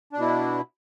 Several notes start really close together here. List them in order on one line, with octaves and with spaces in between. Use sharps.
D4 B2 E4